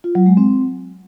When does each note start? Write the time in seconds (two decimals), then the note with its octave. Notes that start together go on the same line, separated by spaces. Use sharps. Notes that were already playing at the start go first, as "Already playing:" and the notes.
0.04 F4
0.15 F#3
0.26 G#3
0.37 C4